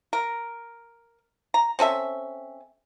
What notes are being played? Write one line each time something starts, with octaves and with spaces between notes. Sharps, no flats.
A#4
A#5
C4 C#4 A4 E5